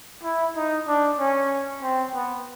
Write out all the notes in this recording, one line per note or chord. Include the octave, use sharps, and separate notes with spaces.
E4
D#4
D4
C#4
C4
B3